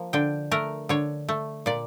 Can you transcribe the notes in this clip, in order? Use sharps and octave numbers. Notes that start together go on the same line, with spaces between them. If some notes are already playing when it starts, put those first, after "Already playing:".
Already playing: F3 A#3
D3 G5
A3 A#4
D3 C#5
A3
A#2 D5